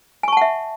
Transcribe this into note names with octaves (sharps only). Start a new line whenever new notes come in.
E5 F#5 G#5 A5 C#6